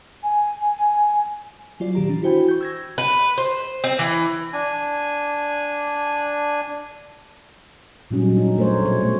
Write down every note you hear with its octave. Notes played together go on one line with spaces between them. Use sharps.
G#5
F#3 F4 D5
A#2 D#3 G4 A#5
E3 D4
E4 F#4 C5 G5 G#5 B5
C#6 G6
E6 G#6 A#6
B4
C5
C4
E3
D4 G#5
A#2 F#3 G3 C#4 D#4
D4 D#4
A3 A#4 C5 C#5
B2 C#5
A3